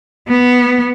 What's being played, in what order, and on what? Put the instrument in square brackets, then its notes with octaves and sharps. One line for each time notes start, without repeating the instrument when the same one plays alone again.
[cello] B3